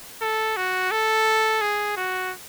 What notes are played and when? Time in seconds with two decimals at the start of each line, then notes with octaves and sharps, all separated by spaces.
0.21 A4
0.56 F#4
0.91 A4
1.61 G#4
1.97 F#4